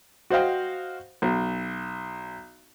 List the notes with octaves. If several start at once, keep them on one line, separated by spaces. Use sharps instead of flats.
F#4 C5 D#5 F5 G5
B1